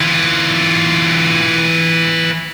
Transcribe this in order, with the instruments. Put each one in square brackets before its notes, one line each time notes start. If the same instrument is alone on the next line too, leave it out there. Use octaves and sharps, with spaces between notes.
[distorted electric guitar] E3 F4